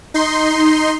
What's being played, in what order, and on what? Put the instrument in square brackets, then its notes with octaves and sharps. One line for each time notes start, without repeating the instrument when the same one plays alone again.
[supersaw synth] D#4 C6